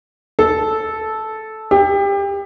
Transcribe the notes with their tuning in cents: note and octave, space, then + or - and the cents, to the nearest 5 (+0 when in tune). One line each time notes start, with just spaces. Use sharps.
A4 -10
G4 +25